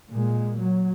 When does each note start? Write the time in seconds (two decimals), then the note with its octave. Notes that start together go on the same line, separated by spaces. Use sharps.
0.12 A#2 G#3
0.59 F#3